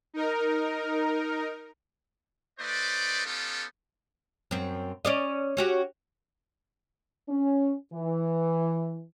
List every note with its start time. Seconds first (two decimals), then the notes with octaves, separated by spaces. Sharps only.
0.14 D#4 A#4
2.60 A3 D#4 B4 C5 D5
3.26 B3 C#4 D#4 F4 G4 A4
4.51 F#2 C4
5.05 C#4 D5 D#5
5.57 C#4 F#4 G4
7.29 C#4
7.93 E3